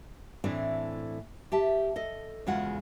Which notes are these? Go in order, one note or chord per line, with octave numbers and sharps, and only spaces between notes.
A2 E3 A3 C4 D4
G4 E5 A5
A4 D#5
E2 C#3 G#3 F4 F#4 F#5